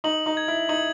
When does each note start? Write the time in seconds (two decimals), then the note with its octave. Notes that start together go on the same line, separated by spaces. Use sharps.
0.04 D#4 F#7
0.26 D#4
0.37 G#6
0.48 E4
0.69 D#4 F#7